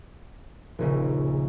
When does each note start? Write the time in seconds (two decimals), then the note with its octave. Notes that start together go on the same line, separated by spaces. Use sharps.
0.79 D#1 A#1 C#3